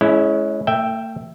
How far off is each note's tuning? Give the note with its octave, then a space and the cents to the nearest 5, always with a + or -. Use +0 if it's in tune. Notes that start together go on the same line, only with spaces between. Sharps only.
G#3 +30 C#4 +0 E4 +0
A3 +40 E5 +0 G5 +0